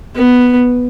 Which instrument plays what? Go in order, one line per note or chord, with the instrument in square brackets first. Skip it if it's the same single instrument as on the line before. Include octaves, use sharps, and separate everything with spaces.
[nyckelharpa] B3